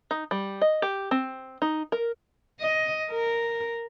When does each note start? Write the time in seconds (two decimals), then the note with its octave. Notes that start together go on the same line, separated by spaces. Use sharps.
0.11 D#4
0.31 G3
0.61 D#5
0.82 G4
1.11 C4
1.62 D#4
1.92 A#4
2.60 D#5
3.11 A#4